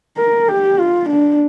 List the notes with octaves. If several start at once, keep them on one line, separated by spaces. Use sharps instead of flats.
A#4
G4
F4
D4